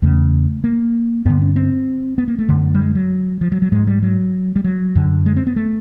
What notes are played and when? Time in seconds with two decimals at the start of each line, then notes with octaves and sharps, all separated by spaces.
0.02 E2 C#3 A3
0.64 A#3
1.26 G2 D3 B3
1.42 C#4
1.56 C4
2.18 B3
2.28 A#3
2.39 A3
2.49 F#2 D3
2.74 G3
2.79 G#3
2.95 F#3
3.41 F3
3.52 F#3
3.62 F#3
3.72 G#2 G#3
3.87 G3
4.03 F#3
4.56 G3
4.64 F#3
4.95 F#2 D3
5.26 G#3
5.36 C4
5.47 B3
5.56 A3